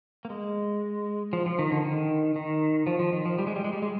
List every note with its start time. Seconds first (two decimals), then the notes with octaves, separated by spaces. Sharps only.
0.25 A#3
0.30 G#3
1.33 F3
1.46 F3
1.59 D#3
1.72 D3
1.84 D#3
2.36 D#3
2.87 F3
2.99 F3
3.13 D#3
3.26 F3
3.39 G3
3.47 G#3
3.56 G3
3.64 G#3
3.73 G3
3.82 G#3